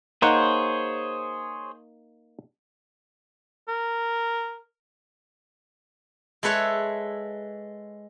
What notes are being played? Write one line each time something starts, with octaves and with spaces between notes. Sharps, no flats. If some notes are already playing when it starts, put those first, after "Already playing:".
A#3 D#4 G#4 C5 C#5 F#5
A#4
G#3 A4 B4 C#5 E5